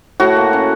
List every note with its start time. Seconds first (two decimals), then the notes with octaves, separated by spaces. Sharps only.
0.20 A2 F#4
0.36 A#3
0.53 C#4